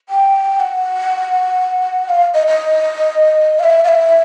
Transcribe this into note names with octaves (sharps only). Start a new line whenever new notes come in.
G5
F#5
F5
D#5
D#5
F5
E5
F5
E5